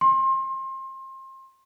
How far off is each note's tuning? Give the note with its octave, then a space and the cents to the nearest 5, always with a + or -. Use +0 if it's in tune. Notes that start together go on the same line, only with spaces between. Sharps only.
C6 +30